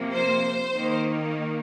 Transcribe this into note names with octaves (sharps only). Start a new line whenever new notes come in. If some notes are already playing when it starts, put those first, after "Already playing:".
Already playing: C3 F3 A#3
C5
D#3 A#3